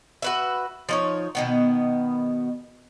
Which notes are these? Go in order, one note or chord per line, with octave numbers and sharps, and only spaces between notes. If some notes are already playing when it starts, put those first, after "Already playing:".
F#4 B4 E5
F3 D#4 C#5
B2 D#3 B3